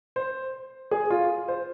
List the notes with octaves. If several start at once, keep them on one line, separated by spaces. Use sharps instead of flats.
C5
G#4
F4
C5